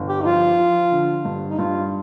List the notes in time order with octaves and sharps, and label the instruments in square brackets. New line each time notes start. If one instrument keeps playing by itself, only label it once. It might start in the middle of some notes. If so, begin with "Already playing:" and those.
Already playing: [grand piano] G1
[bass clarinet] G4
D#4
[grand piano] F3 [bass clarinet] F4
[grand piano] F3
D3
G2
[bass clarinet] D#4
[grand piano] G2 [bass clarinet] F4